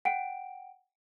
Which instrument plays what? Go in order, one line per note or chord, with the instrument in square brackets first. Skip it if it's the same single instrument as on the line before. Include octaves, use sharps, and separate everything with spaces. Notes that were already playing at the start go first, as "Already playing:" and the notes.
[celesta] F#5 G5 D7